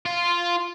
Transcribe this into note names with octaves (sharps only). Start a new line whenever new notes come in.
F4